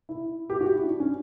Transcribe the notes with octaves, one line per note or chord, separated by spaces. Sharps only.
E4
G4
F#4
E4
D4
C#4